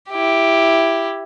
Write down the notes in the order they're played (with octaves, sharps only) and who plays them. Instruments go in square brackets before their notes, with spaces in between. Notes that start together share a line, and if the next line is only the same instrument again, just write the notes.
[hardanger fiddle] E4 G4